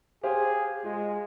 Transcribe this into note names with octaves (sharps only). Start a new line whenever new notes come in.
G4 G#4 C5 F5
G#3 F4